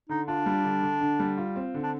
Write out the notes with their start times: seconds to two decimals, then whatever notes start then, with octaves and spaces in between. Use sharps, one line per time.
0.09 D3 D#4
0.27 D4 F4
0.46 G3
0.64 D3
0.82 D3
1.01 D3
1.20 G3
1.38 F4
1.56 C4
1.74 D3
1.83 D4